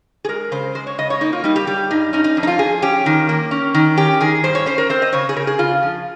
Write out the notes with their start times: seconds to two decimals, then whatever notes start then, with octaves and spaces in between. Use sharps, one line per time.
0.25 G#4
0.29 G#3 A#4
0.52 C#3 C5
0.75 G#3 C5
0.87 C#5
0.98 C#3 D#5
1.10 C#5
1.21 A#3 D#4
1.33 F4
1.44 G3 D#4
1.56 G4
1.67 G3 G4
1.91 G2 D#4
2.13 C#4 D#4
2.24 D#4
2.37 F2
2.43 D#4
2.47 F4
2.59 F2 G#4
2.82 C#4 G4
3.06 D#3
3.29 A#3
3.51 C#4
3.74 D#3
3.97 C#4 G4
4.21 D#3 G#4
4.44 G2 C5
4.55 C#5
4.66 C#4 C5
4.78 A#4
4.90 C4 C5
5.02 D#5
5.13 C#3 C#5
5.29 G#4
5.36 C#3 A#4
5.47 G#4
5.58 C#3 F4
5.83 F3